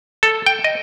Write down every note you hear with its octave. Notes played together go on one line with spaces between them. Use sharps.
A4
G5
D#5